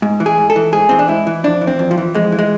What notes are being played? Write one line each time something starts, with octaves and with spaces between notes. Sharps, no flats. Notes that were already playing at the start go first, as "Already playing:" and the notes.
G#2
E3
G#4
G#2
A4
E3
G#2 G#4
E3 C4
D4
G#2 E4
E3
F2 D4
E3
C4
F2
F3
E3
F2 G#3
E3
G#3